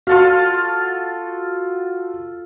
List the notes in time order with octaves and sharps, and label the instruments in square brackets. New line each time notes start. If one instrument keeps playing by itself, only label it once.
[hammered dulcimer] F4 A4 F5 [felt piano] F#4